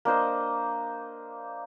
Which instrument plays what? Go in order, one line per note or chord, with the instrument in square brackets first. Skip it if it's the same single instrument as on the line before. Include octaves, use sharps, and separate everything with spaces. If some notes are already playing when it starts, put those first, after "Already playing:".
[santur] A#3 D4 C5 D#5